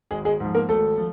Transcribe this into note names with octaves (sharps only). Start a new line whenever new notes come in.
G#1 G#3 G#4
G#3 G#4
G#2 F3
A#3 A#4
G#1 A3 A4
F3